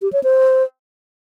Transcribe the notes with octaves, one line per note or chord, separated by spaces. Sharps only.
G4
C#5
C5